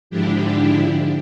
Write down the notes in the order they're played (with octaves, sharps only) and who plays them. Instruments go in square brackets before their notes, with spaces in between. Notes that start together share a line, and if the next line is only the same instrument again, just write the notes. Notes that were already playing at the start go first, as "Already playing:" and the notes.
[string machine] G#2 D3 F3 D4 E4 G4